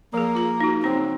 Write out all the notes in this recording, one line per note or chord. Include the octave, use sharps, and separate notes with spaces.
F3 A#3 G#4
F4 A#5
D#4 F#4
C#3 F#3 C4 D#4